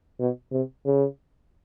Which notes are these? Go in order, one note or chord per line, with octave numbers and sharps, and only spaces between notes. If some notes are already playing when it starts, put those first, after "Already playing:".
B2
C3
C#3